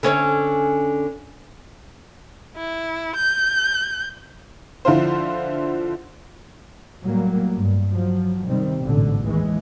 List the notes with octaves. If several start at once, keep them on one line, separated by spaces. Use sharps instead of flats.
D3 C#4 C#5
E4
G6
D3 F3 E4 F4 C5
A2 F#3 G3 A#3
G2
F3 F#3
C3 D#3 G3 C4
A1 G#2 B2 D3
D#2 E3 G#3